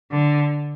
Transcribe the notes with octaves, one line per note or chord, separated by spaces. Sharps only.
D3